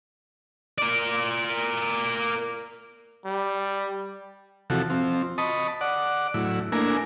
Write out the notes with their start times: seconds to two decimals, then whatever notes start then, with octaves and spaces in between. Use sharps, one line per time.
0.78 A#4 D5
3.25 G3
4.70 C3 E3 F3 F#4 A4
4.90 F3 C4
5.38 D#5 A5 B5 C#6 D#6
5.81 D5 F#5
6.34 A2 F#3 E4
6.72 A3 A#3 D4 E4 A#4 G#5